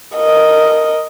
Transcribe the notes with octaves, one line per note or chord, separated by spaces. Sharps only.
A#4 D#5